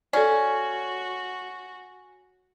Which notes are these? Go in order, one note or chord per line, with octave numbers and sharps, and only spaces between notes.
C#4 F#4 A4 D5